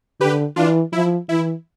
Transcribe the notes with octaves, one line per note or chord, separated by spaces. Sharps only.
D3 G4 B4
E3 D4 F4
F3 E4
E3 E4